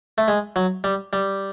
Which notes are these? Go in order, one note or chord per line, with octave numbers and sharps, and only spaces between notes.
A3
G#3
F#3
G3
G3